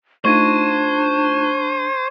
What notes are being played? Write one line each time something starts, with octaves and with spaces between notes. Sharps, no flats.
A3 D4 D#4 F4 C5 C#6 G#6 D#7